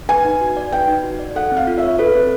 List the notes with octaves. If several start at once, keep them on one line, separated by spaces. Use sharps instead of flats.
B4 G#5
D#4
F#4
D5
B4 G5
D#4
F#4
D5
A4 F#5
C4
F5
F4
C#5 E5
A4 B4
C4